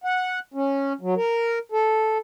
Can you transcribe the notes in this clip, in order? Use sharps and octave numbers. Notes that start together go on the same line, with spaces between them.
F#5
C#4
F#3
A#4
A4